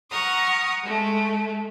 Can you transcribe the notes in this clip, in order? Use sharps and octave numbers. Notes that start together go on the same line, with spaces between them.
F#5 A#5 C#6 D#6 F6
G#3 A3